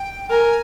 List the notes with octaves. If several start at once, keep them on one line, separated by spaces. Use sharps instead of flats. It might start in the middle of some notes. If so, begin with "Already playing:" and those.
Already playing: G5
A#4 G#5